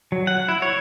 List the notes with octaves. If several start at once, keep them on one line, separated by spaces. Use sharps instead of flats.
F#3
F#5
E4
C#5